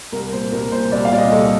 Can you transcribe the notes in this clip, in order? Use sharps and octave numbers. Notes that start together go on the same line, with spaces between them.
C2 A#4
A#2 C5
C2 A#4
A#2 C5
C2 D5
F5
A#2 D5
D#5
C2 A4